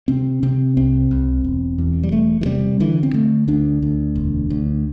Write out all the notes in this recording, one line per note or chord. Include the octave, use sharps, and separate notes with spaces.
C3 C4
C3 C4
C2 C4
C2
E1
E2
G3
E1 A3
E3
C3 G3
D3 E3
C4
D3 A3
D2 D4
D2
E1
D2